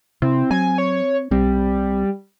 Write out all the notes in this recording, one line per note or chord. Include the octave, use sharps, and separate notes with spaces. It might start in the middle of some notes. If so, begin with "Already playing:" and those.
C3 C4 E4
F#3 C4 G#5
C#5
B1 G3 C4